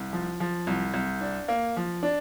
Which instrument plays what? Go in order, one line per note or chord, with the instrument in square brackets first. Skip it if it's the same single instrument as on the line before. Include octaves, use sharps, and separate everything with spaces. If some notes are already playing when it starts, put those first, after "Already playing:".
Already playing: [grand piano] C2
F3
F3
C2
C2
D4
A#3
F3
D4